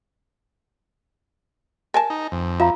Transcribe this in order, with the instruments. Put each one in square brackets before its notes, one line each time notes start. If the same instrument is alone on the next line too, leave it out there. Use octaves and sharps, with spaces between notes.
[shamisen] A#4 G#5 A5
[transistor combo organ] D#4
F2
[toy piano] F4 F5 A#5 [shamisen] E5